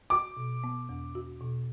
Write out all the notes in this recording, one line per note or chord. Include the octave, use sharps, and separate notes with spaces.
F#4 D6
B2
B3
E2
F#4
B2